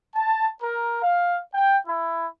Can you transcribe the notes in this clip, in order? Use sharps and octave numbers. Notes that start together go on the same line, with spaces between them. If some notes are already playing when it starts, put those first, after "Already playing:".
A5
A#4
F5
G5
E4